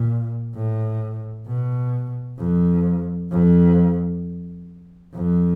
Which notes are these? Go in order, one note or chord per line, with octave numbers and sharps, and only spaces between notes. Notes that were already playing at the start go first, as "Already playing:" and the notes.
Already playing: A#2
A2
B2
F2
F2
F2